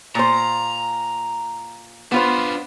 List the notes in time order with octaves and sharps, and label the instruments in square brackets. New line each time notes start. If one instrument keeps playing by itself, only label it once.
[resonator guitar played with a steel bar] A#2 C5 [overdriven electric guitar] A#5
[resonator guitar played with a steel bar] B3 F4 C5 [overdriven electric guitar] D4 B4